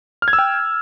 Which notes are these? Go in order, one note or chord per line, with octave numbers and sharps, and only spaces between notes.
F6
G#6
E6
G5